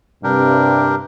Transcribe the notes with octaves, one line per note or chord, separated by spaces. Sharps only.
G2 C3 D4 G4 A#4